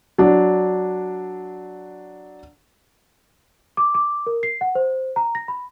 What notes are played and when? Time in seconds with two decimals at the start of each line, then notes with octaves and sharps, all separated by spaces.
0.18 F#3 D4
3.77 D6
3.95 D6
4.27 A#4
4.43 C7
4.61 F#5
4.75 C5
5.16 A#5
5.35 A#6
5.48 B5